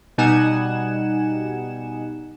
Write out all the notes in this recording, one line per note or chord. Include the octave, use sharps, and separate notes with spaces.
B2 G3 D#4 F#5 G#5 E7